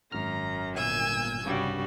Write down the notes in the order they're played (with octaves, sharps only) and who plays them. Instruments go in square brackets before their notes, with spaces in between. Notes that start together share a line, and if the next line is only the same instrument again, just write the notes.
[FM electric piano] G#1 F6 [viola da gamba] F#2 [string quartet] A#5
[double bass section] G1 A#2 [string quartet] G#5 E6 G6
[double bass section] C2 G2 [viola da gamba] C#3 G3 F#4